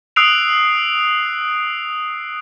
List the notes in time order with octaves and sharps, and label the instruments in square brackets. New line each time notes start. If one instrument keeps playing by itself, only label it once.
[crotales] D#6 E6 F#6 C7 D7 F7